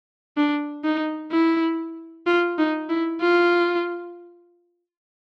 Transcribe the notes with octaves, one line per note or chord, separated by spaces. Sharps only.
D4
D#4
E4
F4
D#4
E4
F4